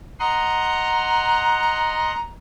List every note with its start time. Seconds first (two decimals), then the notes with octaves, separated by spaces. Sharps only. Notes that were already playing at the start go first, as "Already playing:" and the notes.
0.19 D#5 F#5 A#5 C6